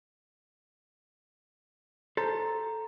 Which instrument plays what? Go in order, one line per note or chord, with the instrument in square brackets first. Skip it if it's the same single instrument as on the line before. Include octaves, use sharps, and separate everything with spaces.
[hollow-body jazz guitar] A4 C5 [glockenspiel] A#5